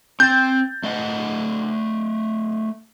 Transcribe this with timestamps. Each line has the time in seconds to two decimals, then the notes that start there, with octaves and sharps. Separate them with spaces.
0.20 C4 G6 A6
0.84 A3 D#5 F#5